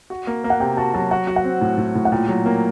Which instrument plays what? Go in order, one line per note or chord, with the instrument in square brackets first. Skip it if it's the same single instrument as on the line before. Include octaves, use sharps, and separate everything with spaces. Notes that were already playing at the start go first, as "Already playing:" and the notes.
[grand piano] F#4
A#3
A#3
[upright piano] F#5
[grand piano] C3 [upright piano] G5
[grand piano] F#4 [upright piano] A5
[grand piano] F#3 [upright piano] A5
[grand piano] F#4 [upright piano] F#5
[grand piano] F#4
[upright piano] F#5
[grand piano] C4
A2
A2
A2
[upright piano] F#5
[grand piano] A#2 [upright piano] G5
[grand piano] F#3
A#3